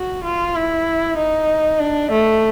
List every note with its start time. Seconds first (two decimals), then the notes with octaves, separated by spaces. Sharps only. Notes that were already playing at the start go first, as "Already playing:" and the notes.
Already playing: F#4
0.24 F4
0.56 E4
1.17 D#4
1.79 D4
2.11 A3